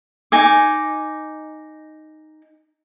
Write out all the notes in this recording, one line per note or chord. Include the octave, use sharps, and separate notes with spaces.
D#4 G#5 D6